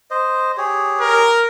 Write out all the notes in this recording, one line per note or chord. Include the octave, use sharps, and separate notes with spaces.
C5 D#5
G4 G#4 C#5
A#4